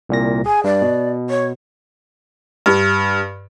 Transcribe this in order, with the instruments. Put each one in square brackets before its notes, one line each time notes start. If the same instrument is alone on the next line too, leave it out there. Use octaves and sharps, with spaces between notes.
[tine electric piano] C2 A#2 A#6
[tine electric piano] G#4 [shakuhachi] G#5
[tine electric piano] G2 [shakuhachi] D5
[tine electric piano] B2
[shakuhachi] C#5
[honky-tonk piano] G2